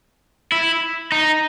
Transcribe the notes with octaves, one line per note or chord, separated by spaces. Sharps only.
E4
D#4